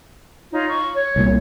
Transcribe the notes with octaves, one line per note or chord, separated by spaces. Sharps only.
D#4 F4 C#5
C#6
C#5
C2 A#2